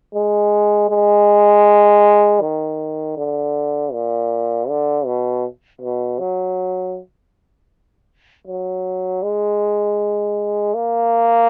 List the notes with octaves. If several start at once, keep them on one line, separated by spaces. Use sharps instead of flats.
G#3
G#3
D#3
D3
A#2
D3
B2
B2
F#3
F#3
G#3
A#3